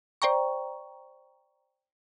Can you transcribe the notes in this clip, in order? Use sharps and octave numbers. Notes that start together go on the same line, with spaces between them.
C5 D5 G5 A#5 C#6